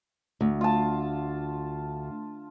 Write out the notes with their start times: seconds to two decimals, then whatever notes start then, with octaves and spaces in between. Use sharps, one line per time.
0.41 D2
0.61 F4 A5